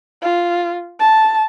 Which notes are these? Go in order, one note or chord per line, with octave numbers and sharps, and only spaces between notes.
F4
A5